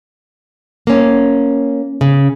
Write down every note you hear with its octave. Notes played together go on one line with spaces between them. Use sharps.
A#3 C#4
C#3